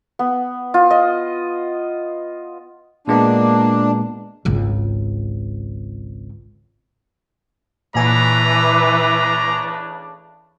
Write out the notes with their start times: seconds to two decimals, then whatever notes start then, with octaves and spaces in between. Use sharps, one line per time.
0.19 B3
0.74 F4
0.90 D#5
3.08 A#2 G#3 A#3 B3 D4
4.45 G#1 C#2
7.95 A#2 C#3 E3 A3 D4 B4 G#5 A#5